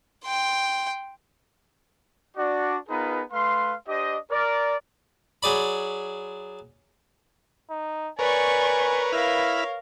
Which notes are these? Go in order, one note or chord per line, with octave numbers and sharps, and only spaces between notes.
G5 C6
D4 F#4 D5
B3 D#4 F4 G#4 A#4 B4
A3 B4 F5 C6
D4 G4 C5 D#5
A#4 D5
F#3 G#4 D5 B5
D#4
A#4 B4 C#5 D5 G#5 C#6
E4 A#4 C#5 F5 B5 F6